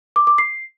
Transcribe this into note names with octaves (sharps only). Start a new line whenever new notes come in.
D6
D6
C7